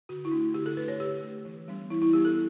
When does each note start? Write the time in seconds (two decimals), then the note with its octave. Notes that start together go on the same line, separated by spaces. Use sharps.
0.09 D3 F#4
0.25 E4
0.32 A3 D4
0.54 D3 G4
0.66 A4
0.77 A3 D4 B4
0.88 C#5
1.00 D3 G4
1.23 A3 D4
1.45 E3
1.68 G3 B3 D4
1.90 E3 E4
2.02 E4
2.13 G3 B3 D4 G4
2.25 A4